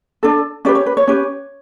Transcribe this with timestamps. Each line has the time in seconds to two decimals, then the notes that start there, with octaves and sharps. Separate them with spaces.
0.23 D4 A4
0.65 C#4 G4 B4 D5
0.75 C#5
0.86 B4
0.97 C#5
1.08 C#4 G4 B4